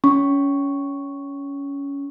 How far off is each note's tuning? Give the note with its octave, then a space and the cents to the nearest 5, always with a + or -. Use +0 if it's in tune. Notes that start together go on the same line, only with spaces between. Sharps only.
C#4 +20 C#6 +0